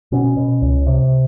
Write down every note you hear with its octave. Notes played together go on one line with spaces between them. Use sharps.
B2 C#4
B2
C#2
C3